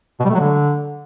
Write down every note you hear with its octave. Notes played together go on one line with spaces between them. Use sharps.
B2
G3
A3
F#3
D3